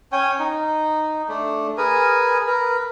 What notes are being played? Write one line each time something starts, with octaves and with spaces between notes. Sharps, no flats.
C#4 C#5 G5 G#5
D#4
A3 D4
G#4 A#4 B4 G#5
A#4 B4